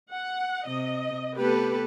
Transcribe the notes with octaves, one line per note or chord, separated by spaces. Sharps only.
F#5
C3 D#5
A3 B3 G4 A4 B4